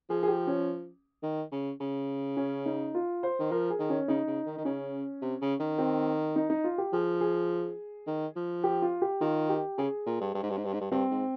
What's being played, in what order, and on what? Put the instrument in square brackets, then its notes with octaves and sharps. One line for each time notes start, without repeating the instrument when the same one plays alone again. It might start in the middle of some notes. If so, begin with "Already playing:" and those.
[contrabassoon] F3 [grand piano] G#4
[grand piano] G#4
G4
C#4
[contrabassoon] D#3
C#3
C#3
[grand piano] C#4
D#4
F4
C5
[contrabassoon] D#3
[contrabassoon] F3 [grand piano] A#4
[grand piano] G#4
[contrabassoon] D#3
[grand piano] C#4
[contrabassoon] C#3 [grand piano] D#4
[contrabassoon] C#3
D#3
D#3
[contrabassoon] C#3 [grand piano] C#4
[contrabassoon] C3
C#3
D#3
[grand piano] C4
D#4
D#4
F4
G4
[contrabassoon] F3 [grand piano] G#4
[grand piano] G#4
[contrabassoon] D#3
F3
[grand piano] G4
F4
G4
[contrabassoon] D#3 [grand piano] F4
[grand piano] G4
[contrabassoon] C#3 [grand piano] G#4
[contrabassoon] A#2
G2
G2
G#2
G2
G#2
G2
G#2
G2
[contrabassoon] G2 [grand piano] C4
[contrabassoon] G#2